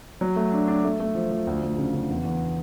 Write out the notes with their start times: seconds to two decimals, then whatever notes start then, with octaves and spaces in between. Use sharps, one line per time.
0.21 F#3
0.36 A3
0.52 D4
0.67 D4
0.84 A3
1.00 A3
1.15 F3
1.31 F3
1.47 D2
1.62 D2
1.78 C#3
1.94 C#3
2.09 E2
2.25 E2